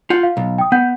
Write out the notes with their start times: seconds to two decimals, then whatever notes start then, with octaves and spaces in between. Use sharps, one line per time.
0.10 F4 F#5 G6
0.23 F5
0.37 B1
0.58 G5 D#6
0.72 B3 F#5 G6